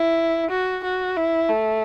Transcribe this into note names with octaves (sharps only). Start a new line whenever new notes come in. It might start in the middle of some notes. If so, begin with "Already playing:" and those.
Already playing: E4
F#4
F#4
E4
A3